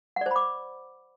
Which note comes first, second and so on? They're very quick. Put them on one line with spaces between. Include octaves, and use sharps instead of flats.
F#5 D5 C5 B5 D6